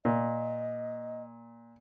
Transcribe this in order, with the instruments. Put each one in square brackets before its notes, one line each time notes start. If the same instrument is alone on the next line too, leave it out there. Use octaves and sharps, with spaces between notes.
[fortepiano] A#2 [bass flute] D#5